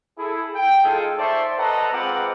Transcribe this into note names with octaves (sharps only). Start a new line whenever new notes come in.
E4 G#4 A4
G5
G#3 D#4 F4 G#4 A4
C5 D5 E5 A5 C6 C#6
A4 B4 D#5 F#5 A#5
G#3 C4 F4 B4 F#5 D6